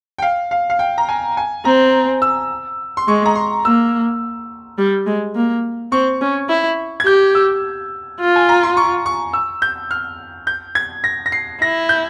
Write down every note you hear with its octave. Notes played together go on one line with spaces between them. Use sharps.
G5
F5
F5
F5
G5
A#5
G#5
G#5
C4 A#5
E6
C6
G#3 C#6
A#5
C6
A#3 E6
G3
G#3
A#3
C4 C#6
C#4
E4
G#6
G4 G6
E6
F4
G#5
A#5
C6
C#6
C#6
E6
G6
F6
G6
G#6
A#6
A#6
C7
E4 A#6
G6